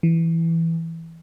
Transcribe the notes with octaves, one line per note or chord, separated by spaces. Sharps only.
E3